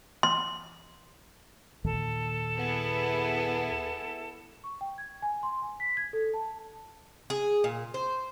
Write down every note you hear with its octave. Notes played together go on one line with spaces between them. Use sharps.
C6
D#2 A#2 D#3 A4
B3 E4 G#4
C#6
G5
G#6
G#5
C6
G#5
B6
G#6
A4
A5
G#4
A#2
C5